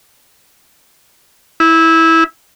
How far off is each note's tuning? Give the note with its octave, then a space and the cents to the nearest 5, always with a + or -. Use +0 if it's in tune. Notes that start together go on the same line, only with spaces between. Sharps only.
E4 -15